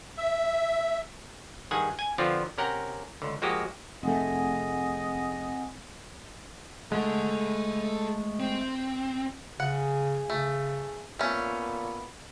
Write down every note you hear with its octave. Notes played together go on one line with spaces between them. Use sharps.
E5
G2 D#3 G#4 F#5 G#5
G#5
D3 F3 B3 C4 F4 D5
C3 C#4 A#4 F#5 G5
C#2 D3
F3 G#3 A#3 F#4 G4 D#5
F1 A3 C4 G#4 D#5 F#5 G#5
G#3 A3 A4 F#5
C4
C#3 G#4 F#5
C#3 A3
A#2 A3 B3 C#4